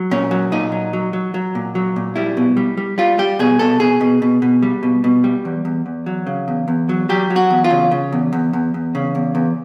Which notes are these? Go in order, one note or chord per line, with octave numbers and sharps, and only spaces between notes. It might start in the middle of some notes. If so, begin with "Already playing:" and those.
Already playing: F#3
A#2 C#4
F#3
A#2 D#4
F#3
F#3
F#3
F#3
A#2
F#3
A#2
G3 E4
B2
G3
G3
G3 F4
G3 G4
B2 G#4
B2 A4
B2 G#4
B2
B2
B2
G3
B2
B2
G3
E2
E2
E2
F#3
C#3
E2
E2
F#3
F#3 G4
F#3
F#4
E2
F4
C#3
C#3
E2
E2
E2
E2
C#3
E2
E2